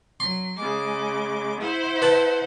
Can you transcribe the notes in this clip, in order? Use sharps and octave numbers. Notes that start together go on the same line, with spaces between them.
F#3 C6
C#3 G#3 D6
E4 C5 F#5
B4 A5